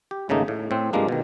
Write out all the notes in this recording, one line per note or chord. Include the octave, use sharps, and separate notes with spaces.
G4
G#1 C#3 A3 A#3 D#4
A2
A2 C4
G2 C3 F3 G#3 A#3 D4
B2 D#3